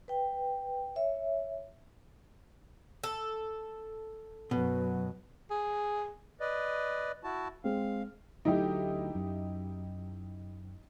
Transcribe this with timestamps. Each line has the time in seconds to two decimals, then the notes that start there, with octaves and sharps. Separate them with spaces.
0.08 B4 G5
0.96 C#5 E5
3.03 A4
4.51 F#2 B2 F#3 B4
5.51 G#4
6.40 B4 D5 D#5
7.24 E4 F#4 A5
7.64 G#3 C4 F5
8.45 D2 F#3 A3 D#4 E4 G4
9.15 F#2